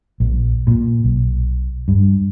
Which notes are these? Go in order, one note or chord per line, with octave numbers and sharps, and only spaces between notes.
A#1
A#2
B1
G2